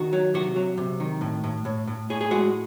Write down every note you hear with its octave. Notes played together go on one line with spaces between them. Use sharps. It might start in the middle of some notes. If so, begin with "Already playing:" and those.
Already playing: D#3 F#4
F#3
C3 F#4
F#3
C3
D#3
A2
A2
A2
A2
A2 G#4
G#4
G#3 F#4